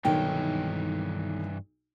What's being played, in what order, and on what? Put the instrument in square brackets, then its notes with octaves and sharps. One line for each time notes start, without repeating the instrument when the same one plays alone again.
[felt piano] B1 [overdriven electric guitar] G2 E3 [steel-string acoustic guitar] D#3 G5